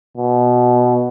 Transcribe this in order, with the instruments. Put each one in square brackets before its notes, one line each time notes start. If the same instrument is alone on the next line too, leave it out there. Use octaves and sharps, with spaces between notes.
[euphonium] B2